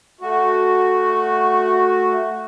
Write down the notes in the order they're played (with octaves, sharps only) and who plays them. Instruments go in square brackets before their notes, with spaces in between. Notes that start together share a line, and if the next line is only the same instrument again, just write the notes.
[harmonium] A3 F#4